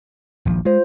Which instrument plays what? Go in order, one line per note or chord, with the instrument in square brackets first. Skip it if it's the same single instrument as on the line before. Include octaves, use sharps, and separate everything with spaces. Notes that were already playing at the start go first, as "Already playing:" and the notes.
[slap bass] D#1 A#1 F3
[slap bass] G#3 [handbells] F4 C5